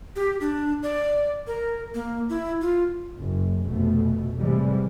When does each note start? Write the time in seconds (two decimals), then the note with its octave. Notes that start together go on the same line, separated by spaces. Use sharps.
0.16 G4
0.41 D4
0.83 D5
1.47 A#4
1.95 A#3
2.29 E4
2.62 F4
3.18 F#1
3.65 F1 B2 A3
4.38 A2 C3 E3 G3 G#3